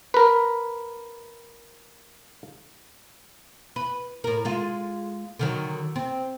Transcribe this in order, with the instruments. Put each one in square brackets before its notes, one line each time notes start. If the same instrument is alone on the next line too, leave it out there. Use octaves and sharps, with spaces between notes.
[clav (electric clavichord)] A#4 B4
[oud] B4
A2 A#4
G#3 F4
D3 D#3 F#3
C4